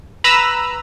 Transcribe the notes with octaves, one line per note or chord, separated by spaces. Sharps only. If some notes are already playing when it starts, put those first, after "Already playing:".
B4 A#5 B5 E6